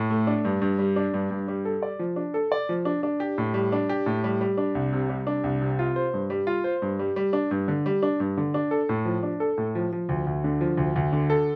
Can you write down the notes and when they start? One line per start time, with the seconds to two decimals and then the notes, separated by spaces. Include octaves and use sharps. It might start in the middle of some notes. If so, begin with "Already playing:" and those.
Already playing: A2
0.10 A3
0.27 D4
0.45 G2
0.62 G2
0.79 G3
0.96 D4
1.14 G2
1.31 G2
1.48 G3
1.65 A4
1.83 D5
1.99 F3
2.16 D4
2.34 A4
2.52 D5
2.69 F3
2.85 D4
3.03 D4
3.20 G4
3.38 A2
3.54 G3
3.72 D4
3.89 G4
4.06 A2
4.24 G3
4.41 G3
4.58 D4
4.75 C2
4.93 C3
5.09 G3
5.27 D4
5.44 C2
5.62 C3
5.79 F4
5.96 C5
6.14 G2
6.30 G3
6.47 F4
6.64 C5
6.82 G2
6.99 G3
7.16 G3
7.33 D4
7.51 G2
7.68 D3
7.86 G3
8.03 D4
8.20 G2
8.38 D3
8.54 D4
8.71 A4
8.89 A2
9.05 F3
9.23 D4
9.40 A4
9.58 A2
9.75 F3
9.93 F3
10.09 D2
10.27 D2
10.44 D3
10.61 F3
10.77 D2
10.96 D2
11.13 D3
11.30 A4